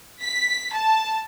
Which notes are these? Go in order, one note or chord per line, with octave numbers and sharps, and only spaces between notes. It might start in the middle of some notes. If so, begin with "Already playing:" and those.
B6
A5